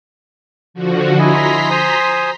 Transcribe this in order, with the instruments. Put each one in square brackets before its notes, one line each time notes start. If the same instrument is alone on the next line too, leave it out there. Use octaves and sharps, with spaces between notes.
[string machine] D3 F3 F#4
[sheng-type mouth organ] E4 D#5 G#5 [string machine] A#5 C6 B6
[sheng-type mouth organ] C5 G#5 D#6